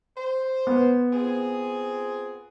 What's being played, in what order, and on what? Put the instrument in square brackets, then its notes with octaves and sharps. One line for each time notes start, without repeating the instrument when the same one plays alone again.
[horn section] C5
[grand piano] B3
[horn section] C4 F4 G#4